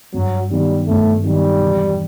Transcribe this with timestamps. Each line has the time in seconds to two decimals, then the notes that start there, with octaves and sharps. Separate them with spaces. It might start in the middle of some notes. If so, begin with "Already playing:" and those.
0.14 G2 F#3
0.50 D#3 F#3 G3 B3 D#4
0.87 G2 A3
1.24 D#3 F#3 G3 B3 D#4
1.60 E1